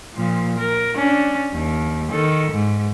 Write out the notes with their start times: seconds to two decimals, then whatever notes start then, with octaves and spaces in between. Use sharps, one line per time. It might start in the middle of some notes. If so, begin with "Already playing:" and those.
0.13 A#2 F3
0.59 A#4
0.96 C#4 D4
1.53 D#2
2.11 D#3 A4
2.51 G#2